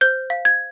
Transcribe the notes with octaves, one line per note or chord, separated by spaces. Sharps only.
C5 G6
F5
G#6